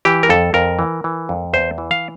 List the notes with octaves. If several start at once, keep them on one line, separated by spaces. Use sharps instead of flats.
E3 G4
A#4
F2 A4
F2 A#4
E3
E3
F2
E2 C5
E3
F5